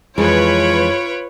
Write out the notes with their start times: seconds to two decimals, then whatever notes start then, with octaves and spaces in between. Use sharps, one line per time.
0.18 F2 E3 G#3 F4 B4 C#5 D7